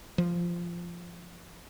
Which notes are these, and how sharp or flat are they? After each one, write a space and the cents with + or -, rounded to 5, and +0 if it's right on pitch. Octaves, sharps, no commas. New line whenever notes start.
F3 -10